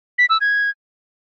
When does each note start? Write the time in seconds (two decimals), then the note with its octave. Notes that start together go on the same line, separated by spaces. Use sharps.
0.18 B6
0.30 E6
0.41 G#6